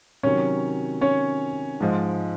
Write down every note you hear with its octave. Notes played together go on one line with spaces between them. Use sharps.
C3 D#3 F#3 C#4 C#5
C#4 C#5
G#2 F3 G#3